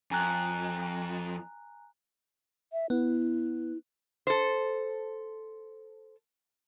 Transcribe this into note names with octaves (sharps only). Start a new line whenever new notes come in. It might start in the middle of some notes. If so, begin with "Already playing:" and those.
F2 G#5 A#5 F#6
E5
B3 E4
A4 C5